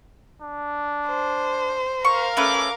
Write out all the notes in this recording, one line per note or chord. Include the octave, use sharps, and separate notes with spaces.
D4
C5
A#4 F5 C#6
A3 C#4 B4 D6